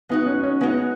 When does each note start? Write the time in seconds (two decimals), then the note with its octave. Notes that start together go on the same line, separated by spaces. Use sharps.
0.09 G#3 B3 D#4 F#4
0.26 C#4
0.43 C#4
0.61 G#3 B3 D#4 F#4